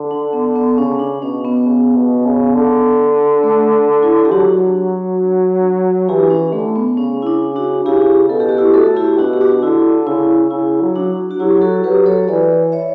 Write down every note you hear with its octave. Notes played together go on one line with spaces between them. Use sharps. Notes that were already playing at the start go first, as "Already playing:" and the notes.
Already playing: D3
D4
B3
B3
C#3 C#4
D4
B2 C#4
B3
C#3
B2
C#3
D3
A3
E4
G4
F#3 D4 F#4
E3 E4 G4
C#4
D3 A3
B3
C#3 C#4
E4
D4
D4 F#4
C#3 E4 G4
B2 A4
G4
F#4
E4 G4
A2 F#4 A4
E4 G4
B2 D4 F#4
G4
D4 F#4
F#4
D3 E4
C#3 E4
C#3 E4
F#3
D4 F#4
F#4
F#3 E4 G4
F#4 A4
F#3 G4 B4
A4 C#5
E3 B4 D5
C#5 E5